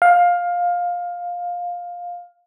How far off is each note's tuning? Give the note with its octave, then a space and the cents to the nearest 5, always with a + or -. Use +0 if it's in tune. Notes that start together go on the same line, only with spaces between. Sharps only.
F5 +15